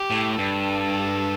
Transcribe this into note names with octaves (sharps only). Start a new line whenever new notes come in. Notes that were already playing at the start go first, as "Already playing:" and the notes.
Already playing: G4
A2
G2 A4